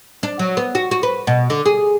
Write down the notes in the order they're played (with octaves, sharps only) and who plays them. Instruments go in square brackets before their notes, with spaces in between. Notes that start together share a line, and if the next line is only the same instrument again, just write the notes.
[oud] D4
F#3
B3
F#4
F#4
B4
B2
D3
G#4